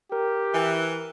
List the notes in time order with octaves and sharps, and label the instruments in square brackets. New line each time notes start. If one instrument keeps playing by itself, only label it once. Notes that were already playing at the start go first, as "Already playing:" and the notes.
[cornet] G4 [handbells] A#4
[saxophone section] E3